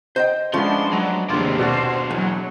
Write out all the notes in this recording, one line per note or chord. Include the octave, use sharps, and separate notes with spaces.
C5 D#5 G5
F3 G#3 A3 B3 C#4 D4 C6
F#3
D#2 C3 A#3 D4 F4 G#4
B2 D4 F#4 C5
E2 F#3